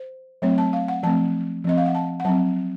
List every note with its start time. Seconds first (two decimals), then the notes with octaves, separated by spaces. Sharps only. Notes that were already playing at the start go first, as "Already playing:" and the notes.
Already playing: C5
0.42 F#3 A3 C4 C#5
0.58 A5
0.73 F5
0.88 F#5
1.03 F3 A3 C4 A5
1.64 F3 C4 D#5
1.78 F5
1.86 F#5
1.95 A5
2.20 F#5
2.25 F#3 C4 A5